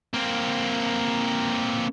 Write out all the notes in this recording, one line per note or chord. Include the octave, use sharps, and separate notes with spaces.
A#3 C4